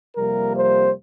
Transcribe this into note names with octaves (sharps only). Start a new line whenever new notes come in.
F2 C3 G3 A#3 A#4
C5